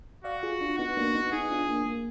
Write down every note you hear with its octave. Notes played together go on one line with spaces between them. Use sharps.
F#4 D5 F5
F4 G#4
D4 F4
B3 D#4 F#4
A#3 D4
B3 D#4
B3 D#4 G#4
D4 F4
A#3 D4
A#3